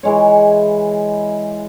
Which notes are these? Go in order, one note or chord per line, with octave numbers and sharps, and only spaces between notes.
E3 G#3 C#5